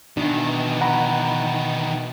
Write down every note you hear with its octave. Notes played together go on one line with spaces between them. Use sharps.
B2 D#3 E3 D4
F#5 A#5 B5